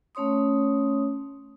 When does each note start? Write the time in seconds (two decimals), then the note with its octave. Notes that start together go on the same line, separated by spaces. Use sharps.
0.15 A3 C#4 C#5 C6 D#6